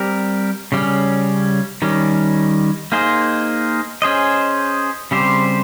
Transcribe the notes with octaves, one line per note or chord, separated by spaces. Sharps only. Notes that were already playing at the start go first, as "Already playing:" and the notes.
Already playing: G3 C4 G4 A#4
C#3 G3 C#4
D#3 G3 C#4
A#3 D#4 G#4 C5
C#4 G#4 C5 D#5
C#3 G3 C4 G4 C5